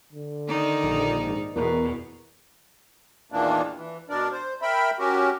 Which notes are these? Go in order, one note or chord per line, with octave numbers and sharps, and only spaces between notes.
D3
D#3 D#4 D5
A#1
G#2
E2 B2 A#4
E2 A#2 D#3 E3 A#3 D4
E3
B2 D4 A#4 D5
C5
A#4 E5 G5 B5
C#4 F#4 G4 A#4